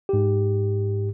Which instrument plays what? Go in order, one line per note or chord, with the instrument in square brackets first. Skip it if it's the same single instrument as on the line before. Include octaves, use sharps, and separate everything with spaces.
[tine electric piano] G#2 G4